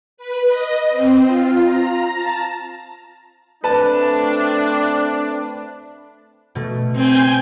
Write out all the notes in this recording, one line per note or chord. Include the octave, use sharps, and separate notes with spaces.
B4
D#5
C4
F4
A#5
A5
A3 C4 D4 B4 A5
B2 A3
C4 G#5 G6